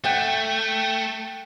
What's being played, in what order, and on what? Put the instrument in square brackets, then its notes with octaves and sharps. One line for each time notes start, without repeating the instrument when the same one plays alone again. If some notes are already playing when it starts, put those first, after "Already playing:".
[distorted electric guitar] A3 [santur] F#5 G5